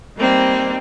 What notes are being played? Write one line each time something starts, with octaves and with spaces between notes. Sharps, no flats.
G3 A#3 C4 D#4